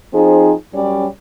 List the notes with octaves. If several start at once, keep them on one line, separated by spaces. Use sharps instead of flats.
F3 C4 D#4 G#4
F#2 G3 C#4 C#5 D5